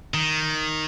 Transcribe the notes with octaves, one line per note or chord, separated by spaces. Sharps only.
D#3